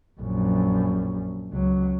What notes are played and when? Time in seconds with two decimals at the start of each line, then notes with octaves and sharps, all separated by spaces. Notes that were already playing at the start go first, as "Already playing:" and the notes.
0.21 A#1 F#2
1.51 C#2 F#3